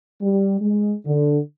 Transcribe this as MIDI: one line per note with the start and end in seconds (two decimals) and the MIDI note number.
0.21 0.60 55
0.61 0.93 56
1.06 1.39 50